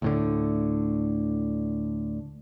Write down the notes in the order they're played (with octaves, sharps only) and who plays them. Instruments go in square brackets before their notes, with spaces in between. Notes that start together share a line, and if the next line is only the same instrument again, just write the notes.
[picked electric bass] D2 A2 D3